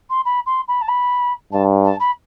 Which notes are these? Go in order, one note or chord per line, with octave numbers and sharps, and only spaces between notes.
C6
B5
C6
B5
A5
B5
G2 A5
A5
B5